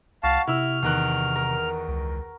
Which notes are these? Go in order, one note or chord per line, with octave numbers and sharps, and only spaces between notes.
C2 F#4 F5 A5
C3 E4 E6 F6
E2 D#3 F#6
A#4
C#2